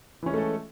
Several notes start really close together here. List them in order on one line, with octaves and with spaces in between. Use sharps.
E3 C#4 G#3 A3 A4